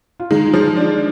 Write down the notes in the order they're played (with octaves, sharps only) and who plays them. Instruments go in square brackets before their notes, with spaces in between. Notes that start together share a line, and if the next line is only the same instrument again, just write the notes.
[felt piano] F4
[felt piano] D#3 D#4 [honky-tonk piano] G#3
[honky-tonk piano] F3
D4